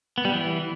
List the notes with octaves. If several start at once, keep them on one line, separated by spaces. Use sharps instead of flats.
B3
G3
E3